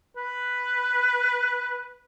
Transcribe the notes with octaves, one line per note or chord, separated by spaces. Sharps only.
B4